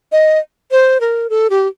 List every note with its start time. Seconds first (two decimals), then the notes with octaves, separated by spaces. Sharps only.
0.12 D#5
0.71 C5
1.01 A#4
1.30 A4
1.50 G4